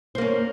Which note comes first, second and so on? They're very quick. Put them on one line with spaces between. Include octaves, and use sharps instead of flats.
C5 A#3 C#4